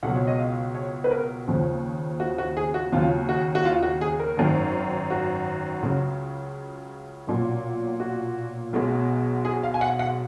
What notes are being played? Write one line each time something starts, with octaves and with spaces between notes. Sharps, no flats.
C#2 B2 F#3 F#5
C#5
D#5
F5
C#5
B4
A#4
D#2 C#3 F3
F#4
F#4
G#4
F#4
D#2 C#3 F#3 F4
F#4
F#4
F4
F#4
G#4
A#4
G#1 F#2 D#3
F#4
C#2 C#3 F#3
B1 A#2 F#3
F#4
B1 B2 G#3
G#4
F5
G#5
F#5
F#5